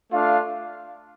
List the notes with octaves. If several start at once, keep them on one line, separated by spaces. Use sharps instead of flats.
A3 D4 F4 F5